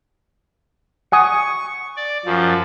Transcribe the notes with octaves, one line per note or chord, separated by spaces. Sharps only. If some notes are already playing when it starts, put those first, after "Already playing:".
F#5 G#5 C#6 D#6
D5
F#2 F3